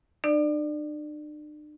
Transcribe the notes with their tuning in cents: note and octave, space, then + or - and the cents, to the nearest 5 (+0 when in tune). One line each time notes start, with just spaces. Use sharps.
D4 +45 D5 +15